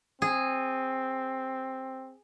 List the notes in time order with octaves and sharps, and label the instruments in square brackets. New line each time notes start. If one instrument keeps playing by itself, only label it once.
[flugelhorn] C4 [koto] G#4